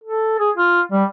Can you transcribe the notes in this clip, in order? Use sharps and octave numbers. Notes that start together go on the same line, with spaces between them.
A4
G#4
F4
G3